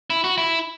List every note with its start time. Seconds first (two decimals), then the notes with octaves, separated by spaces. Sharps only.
0.10 E4
0.24 F#4
0.38 E4